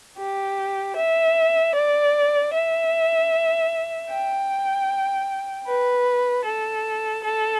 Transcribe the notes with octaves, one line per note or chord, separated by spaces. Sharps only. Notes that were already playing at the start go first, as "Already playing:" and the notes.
G4
E5
D5
E5
G5
B4
A4
A4